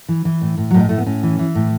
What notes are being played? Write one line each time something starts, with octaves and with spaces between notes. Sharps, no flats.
E3
E3
A2
A2
A2 F#3
G#3
A2 A3
B3
A2 C#4
E3
E3
A2